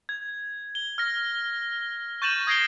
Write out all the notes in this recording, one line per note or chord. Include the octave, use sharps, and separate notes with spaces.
G#6
G7
F6 A#6
C#6 G6 A6 D#7 E7 F#7
D#6 G#6 A#6 C7 D7 G7